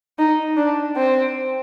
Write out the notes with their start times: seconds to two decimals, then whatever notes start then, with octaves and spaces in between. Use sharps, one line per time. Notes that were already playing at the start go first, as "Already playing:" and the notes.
0.19 D#4
0.57 D4
0.97 C4